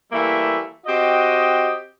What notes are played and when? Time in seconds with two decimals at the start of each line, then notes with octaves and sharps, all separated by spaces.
0.12 E3 G3 A3 A#3 E5
0.86 C4 F#4 G4 D#5